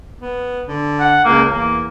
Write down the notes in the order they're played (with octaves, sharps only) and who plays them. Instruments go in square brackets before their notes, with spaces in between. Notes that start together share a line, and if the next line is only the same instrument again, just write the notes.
[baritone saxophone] B3
D3
[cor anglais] F#5
[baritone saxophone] C#2 [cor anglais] A#3
[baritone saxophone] E2 [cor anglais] A#3